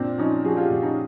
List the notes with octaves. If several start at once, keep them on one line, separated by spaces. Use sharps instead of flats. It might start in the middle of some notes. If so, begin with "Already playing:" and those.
Already playing: A#2 C4 D4
F3 C#4 D#4
F3 F#4 G#4
F4 G4
A#2
C#4 D#4